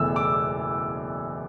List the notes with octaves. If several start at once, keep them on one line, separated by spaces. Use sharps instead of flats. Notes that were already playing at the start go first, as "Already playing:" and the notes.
Already playing: F#1 E2 B2 A3 E4 E6
D6